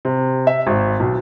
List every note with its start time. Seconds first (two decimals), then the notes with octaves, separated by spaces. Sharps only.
0.05 C3
0.47 E5
0.67 G#1
1.00 B1